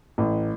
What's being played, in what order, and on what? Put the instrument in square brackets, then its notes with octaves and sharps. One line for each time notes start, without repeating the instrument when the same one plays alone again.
[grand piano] A1